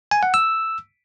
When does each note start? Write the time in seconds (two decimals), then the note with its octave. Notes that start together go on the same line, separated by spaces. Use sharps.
0.11 G#5
0.23 F#5
0.34 E6